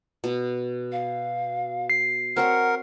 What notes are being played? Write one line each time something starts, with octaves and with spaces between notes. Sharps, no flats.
B2
F5
C7
C4 F#4 A#4 C#5 F#5